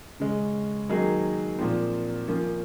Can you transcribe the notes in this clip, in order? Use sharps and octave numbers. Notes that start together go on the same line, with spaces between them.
C#3 G#3 C#4
D#3 F#3 A#3 D#4 G#4
A#2 F3 C4
F3 A#3 C#4